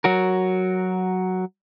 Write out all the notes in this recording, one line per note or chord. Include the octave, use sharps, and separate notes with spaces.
F#3 F#4 A#4